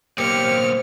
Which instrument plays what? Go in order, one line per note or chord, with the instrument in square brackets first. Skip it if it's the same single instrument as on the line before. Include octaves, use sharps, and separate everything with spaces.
[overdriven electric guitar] B1 A#3 [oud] C4 [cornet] G4 [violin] F6 C#7